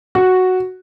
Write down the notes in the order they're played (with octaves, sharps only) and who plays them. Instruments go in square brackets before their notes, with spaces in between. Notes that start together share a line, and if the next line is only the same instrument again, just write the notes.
[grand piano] F#4